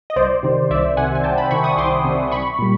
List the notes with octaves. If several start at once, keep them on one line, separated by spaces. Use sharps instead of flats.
D#5
C2 C5 D5
C3 D#3
C2 D5 E5
C3 D#3 F#5 G#5
G#5
C2 G5 A5
A5 B5
C3 D#3 B5 C#6
C#6 D#6
C2 C6 D6
C3 D#3
C2 B5 C#6
A#2 G3